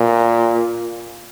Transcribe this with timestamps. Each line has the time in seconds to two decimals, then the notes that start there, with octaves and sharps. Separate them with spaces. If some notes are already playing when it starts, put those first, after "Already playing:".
Already playing: A#2